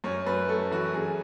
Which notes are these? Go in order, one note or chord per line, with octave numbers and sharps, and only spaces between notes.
F#2 C#5
F#2 B4
A3 A4
E3 F#4
F#2 G#4